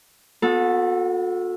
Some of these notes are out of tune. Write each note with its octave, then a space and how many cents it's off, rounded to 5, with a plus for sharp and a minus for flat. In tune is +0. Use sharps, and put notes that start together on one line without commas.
B3 +10 F#4 -40 A4 +0